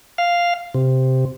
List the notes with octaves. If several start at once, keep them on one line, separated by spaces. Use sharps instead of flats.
F5
C3